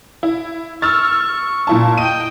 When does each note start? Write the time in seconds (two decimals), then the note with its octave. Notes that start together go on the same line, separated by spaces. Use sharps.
0.23 E4
0.82 C#6 E6 F6 A6
1.67 A#2 E4 A5
1.98 D#5 G5 D#7